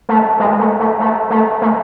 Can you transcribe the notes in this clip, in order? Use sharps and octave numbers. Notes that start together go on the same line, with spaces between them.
A3
G#3
A3
A3
A3
A3
A3